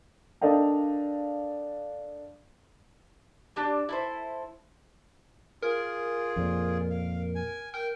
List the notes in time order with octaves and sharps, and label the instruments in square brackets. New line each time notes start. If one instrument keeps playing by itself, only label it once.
[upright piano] D4 A4 A#4 D#5 F5 G5
[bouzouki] D4 G4 A5
E4 A4 C5
[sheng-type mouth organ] F4 G#4 [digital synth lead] A#4
[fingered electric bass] F2 A#2
[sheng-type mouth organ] F5
G#5
[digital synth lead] A#4 [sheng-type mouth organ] G5